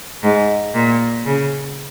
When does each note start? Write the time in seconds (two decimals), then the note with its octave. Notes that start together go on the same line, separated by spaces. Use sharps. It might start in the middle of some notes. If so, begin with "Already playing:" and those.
0.23 G#2
0.75 A#2
1.26 C#3